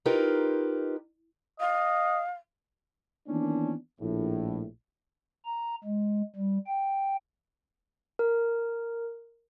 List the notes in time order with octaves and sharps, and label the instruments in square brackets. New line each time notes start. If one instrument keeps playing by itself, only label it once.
[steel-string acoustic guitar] D#4 F4 G4 A#4 B4
[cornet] D#5 [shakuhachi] F5
[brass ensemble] D#3 E3 A#3 B3 C#4 D4
A#1 A2
[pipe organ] A#5
G#3
G3
G5
[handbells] A#4